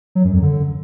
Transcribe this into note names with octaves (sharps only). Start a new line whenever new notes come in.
F#3
F#2
F2
D3